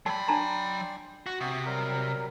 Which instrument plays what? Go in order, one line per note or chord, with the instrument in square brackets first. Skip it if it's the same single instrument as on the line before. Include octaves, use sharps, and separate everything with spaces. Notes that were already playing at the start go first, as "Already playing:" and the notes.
[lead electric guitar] F#3 B5 [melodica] D5 G5 C6 [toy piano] A5
[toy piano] D4 A5 A#5
[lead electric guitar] F#4
[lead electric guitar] C3 [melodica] F#4 D#6
[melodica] F#3 G3 A#4